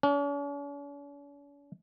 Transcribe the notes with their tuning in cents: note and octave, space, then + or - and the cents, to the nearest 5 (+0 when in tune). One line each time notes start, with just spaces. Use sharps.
C#4 +45